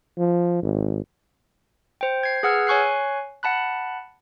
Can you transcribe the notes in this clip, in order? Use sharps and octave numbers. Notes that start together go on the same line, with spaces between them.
F3
G#1
C5 G5
G#6 C7
G#4 B4 F#5 E6 F6 G#6
C#5 G#5 C#6 F#6 C7
F#5 A5 B5 F#6